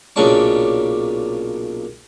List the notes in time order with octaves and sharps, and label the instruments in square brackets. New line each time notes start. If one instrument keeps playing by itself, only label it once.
[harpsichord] B1 A#2 C#3 D4 C#6